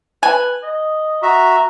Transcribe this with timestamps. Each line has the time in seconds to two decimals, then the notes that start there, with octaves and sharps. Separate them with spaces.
0.23 B4 G#5
0.63 D#5
1.23 F#4 E5 A#5